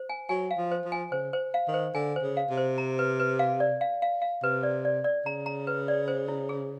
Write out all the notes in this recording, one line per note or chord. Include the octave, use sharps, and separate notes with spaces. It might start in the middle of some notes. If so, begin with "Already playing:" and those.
Already playing: C5
G#5
F#3 G#5
F5
F3
C5
F3
G#5
C#3 C5
C5
F5
D#3
C5
D3 G#5
C5
C#3
F5
C3
C5
A#5
B4
B4
F5
D5
F5
F5
F5
C3 B4
D5
D5
D5
C#3 A#5
A#5
B4
D5
C5
E4
G#4